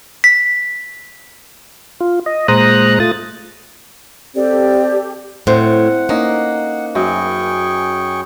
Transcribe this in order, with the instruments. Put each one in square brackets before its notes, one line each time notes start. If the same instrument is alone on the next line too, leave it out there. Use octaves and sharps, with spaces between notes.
[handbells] B6
[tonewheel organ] F4
D#5
A#2 G#3 C5 A#5 D#6 F#6
A3 F4 D#6 A6
[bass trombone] C4 [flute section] G4 A4 [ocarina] D5
[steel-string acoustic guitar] A2 [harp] C4 C5 [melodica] F#5
[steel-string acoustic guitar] A#3 [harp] C#4 D#4
[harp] F#2 [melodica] G#4 G5 C#6